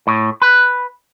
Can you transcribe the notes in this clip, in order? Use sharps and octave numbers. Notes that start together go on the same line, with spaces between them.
A2
B4